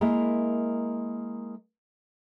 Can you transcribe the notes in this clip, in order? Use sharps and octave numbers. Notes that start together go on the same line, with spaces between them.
G#3 A#3 E4 A#4 E5